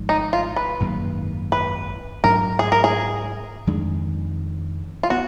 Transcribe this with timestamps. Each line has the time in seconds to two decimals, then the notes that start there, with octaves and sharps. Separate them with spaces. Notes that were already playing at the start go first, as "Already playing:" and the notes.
Already playing: G#1 G#2 F3
0.09 D#4
0.33 F4
0.56 B4
0.80 G#1 F#2 D#3 A#3
1.52 B4
2.24 G#2 F#3 D4 A#4
2.59 G#4
2.72 A#4
2.84 G#4
3.67 F2 D#3 G#3 D4
5.03 F4
5.10 B3 F#4